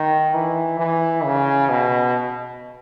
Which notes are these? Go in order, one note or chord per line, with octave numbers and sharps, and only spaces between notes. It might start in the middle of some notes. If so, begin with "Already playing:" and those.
Already playing: D#3
E3
E3
C#3
B2